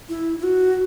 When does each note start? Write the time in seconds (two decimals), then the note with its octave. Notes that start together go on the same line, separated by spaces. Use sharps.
0.09 E4
0.39 E4
0.43 F#4